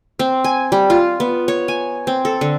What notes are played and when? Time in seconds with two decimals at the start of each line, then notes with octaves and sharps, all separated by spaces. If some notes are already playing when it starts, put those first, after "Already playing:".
0.19 C4
0.44 G#5
0.72 G3
0.90 F4
1.20 B3
1.48 C#5
1.68 G#5
2.07 C4
2.25 A4
2.41 D3